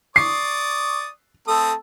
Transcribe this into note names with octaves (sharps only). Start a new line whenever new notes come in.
D5 C#6 D#6 C7
A3 C4 A4 D#6